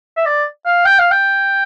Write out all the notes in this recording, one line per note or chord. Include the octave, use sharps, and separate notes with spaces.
E5
D5
F5
G5
F5
G5